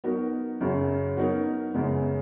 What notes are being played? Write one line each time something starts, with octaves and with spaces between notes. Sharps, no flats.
F#3 B3 D#4 F#4 A#4
F#2 C#3 F#3
F#3 B3 D#4 A#4
F#2 C#3 G#3 B3